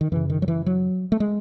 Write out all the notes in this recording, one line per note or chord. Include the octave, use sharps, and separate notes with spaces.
D#3
F#2 C#3 E3
D#3
F#3
E3
F#3
A3
G#3